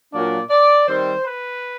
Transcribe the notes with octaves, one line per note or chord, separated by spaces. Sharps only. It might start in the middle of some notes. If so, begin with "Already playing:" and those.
A#2 F#3 A#3 D4 D5
D5
D#3 G3 C4 C5
B4